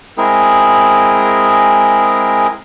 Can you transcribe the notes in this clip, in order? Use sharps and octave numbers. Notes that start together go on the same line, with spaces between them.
G#3 C4 E4 G#4 A#4